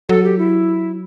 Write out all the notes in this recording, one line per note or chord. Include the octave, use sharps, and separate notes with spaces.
F#3 A4
G4
E4